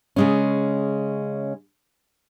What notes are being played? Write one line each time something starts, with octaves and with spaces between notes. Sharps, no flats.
C#3 G#3 C#4